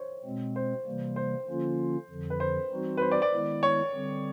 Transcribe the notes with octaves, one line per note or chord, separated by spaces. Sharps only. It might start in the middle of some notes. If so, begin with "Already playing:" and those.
Already playing: C5 C#5
B2 G#3 C4
C5
C3 E3 G3 A#3
C5
D3 F3 A#3 C#4 F4
F2 D3 F3
B4
C5
E3 G3 C4 D#4 F#4
B4
C5
D5
D5
D#3 G#3 B3 E4
C#5
D3 G3 C4